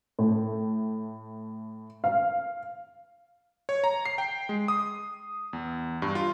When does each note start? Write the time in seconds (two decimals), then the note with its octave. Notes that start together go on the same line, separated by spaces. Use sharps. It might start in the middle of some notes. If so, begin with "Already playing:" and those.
0.19 A2
2.04 F5
3.69 C#5
3.84 A#5
4.05 C7
4.18 G5
4.49 G#3
4.68 D#6
5.53 E2
6.02 G2
6.15 F4